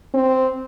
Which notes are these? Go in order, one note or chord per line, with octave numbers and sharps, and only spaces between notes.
C4